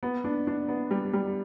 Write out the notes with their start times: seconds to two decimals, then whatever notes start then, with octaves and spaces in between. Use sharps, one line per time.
0.03 B3
0.24 D4
0.47 D4
0.68 B3
0.91 G3
1.13 G3